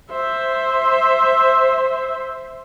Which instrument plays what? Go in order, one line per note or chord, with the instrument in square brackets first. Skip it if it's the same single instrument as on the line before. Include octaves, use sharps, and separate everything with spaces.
[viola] C5 E5